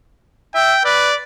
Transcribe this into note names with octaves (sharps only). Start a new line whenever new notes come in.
E5 G5
B4 D5